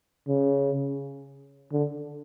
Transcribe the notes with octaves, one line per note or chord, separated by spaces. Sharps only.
C#3
D3